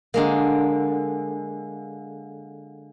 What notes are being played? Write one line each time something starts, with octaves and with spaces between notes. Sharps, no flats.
D3 G#3 A#3